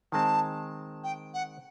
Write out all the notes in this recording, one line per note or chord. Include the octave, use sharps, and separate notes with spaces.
D#3 G#3 C4 A5
G5
F#5